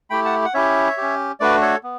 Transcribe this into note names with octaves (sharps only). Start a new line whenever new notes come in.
A3 E4 G4 G5 B5
F#5 A5
F#5
C#4 E4 G4 C#5 E5
C#4 G4
A3 D4 F#4 B4 D5
A4 C#5
B3